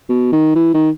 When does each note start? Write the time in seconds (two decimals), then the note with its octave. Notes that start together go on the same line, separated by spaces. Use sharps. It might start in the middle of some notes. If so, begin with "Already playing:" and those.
0.09 B2
0.32 D#3
0.55 E3
0.74 D#3